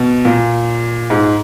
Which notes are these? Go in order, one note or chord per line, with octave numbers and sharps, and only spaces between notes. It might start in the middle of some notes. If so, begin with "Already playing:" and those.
Already playing: B2
A#2
G#2